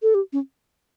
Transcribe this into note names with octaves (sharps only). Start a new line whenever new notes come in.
A4
G4
C#4